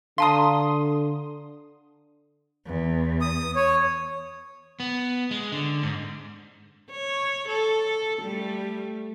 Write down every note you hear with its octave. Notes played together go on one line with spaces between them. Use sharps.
D3 F5 A5 A#5 C6 D#6
E2
D#6
C#5
B3
G#3
D3
G#2
C#5
A4
G3 A3